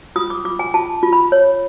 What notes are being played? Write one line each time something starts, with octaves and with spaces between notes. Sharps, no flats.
F4 D#6
D6
F4 D6
G#5
F4 A5
F4
B5
C#5